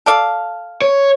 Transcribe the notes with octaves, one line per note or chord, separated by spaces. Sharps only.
A4 D5 F5
C#5